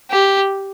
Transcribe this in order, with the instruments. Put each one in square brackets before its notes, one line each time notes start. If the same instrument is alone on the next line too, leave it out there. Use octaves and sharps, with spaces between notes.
[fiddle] G4